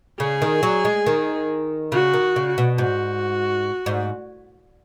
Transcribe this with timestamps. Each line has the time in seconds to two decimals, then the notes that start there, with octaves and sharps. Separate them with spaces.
0.20 C#3 G#4
0.42 D#3
0.63 F#3
0.85 G#3
1.06 D#3
1.92 C#3 F#4
2.13 D#3
2.36 C#3
2.58 B2
2.78 G#2 F#4
3.86 G#2